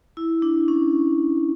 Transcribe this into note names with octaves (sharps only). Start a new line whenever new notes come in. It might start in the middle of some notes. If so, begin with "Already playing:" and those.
E4
D4
C#4